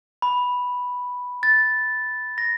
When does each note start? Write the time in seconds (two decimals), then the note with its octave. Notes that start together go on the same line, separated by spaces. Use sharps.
0.22 B5
1.43 A6
2.38 A#6